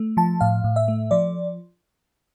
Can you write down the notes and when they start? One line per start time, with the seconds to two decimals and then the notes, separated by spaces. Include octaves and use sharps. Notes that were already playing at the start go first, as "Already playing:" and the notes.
Already playing: A3
0.17 F3 A5
0.41 A2 F5
0.64 A2
0.76 E5
0.88 A3
1.11 F3 D5